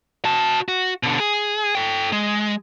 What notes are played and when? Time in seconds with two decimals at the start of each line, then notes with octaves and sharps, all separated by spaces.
0.25 F#4 A5
0.68 F#4
1.03 B2 D3
1.20 G#4
1.75 A4 G5
2.12 G#3